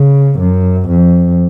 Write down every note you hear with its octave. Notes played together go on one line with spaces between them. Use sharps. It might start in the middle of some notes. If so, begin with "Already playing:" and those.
Already playing: C#3
F#2
F2